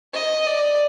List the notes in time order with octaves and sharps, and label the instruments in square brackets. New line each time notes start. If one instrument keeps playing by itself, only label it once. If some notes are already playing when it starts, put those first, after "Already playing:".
[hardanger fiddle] D#5
D5